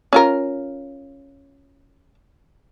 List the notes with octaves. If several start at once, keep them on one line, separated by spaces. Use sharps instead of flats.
C#4 F4 A#4